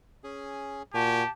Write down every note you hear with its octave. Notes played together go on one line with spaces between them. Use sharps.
C#4 G#4
A#2 F#4 G4 G#5 A5